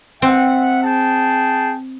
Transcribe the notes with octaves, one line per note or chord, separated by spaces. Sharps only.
C4 E5 F#5
G#4 G5 A5